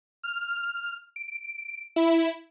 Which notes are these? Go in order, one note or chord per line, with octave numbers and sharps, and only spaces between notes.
F6
D7
E4